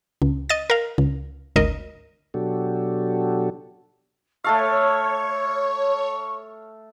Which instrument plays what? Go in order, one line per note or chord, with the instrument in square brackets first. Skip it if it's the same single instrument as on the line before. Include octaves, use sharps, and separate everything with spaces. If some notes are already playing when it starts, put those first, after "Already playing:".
[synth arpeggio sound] C#2
D#5 A6
A#4 F5
C#2
G#1 D2 A#4 D#5
[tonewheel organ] B2 F#3 D4 F#4 G4 A4
[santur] A3 A4 F5 [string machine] C#5 [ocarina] C#6